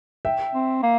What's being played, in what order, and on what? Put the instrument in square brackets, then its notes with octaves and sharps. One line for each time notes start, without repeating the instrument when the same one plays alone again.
[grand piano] E5 G5
[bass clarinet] C4
A#3